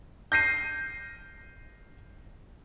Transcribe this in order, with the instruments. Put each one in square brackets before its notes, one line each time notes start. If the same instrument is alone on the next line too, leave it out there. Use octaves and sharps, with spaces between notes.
[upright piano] G6 A#6 C7 D#7